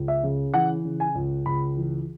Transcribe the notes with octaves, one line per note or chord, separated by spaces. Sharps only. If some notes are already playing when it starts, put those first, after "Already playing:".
Already playing: C#2
E5
C#3
E3 F#5
C#3
G#5
C#2
C#2 B5
E3